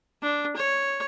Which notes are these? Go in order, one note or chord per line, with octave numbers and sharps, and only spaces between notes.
D4
C#5